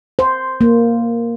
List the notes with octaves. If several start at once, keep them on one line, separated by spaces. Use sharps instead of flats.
C5
A#3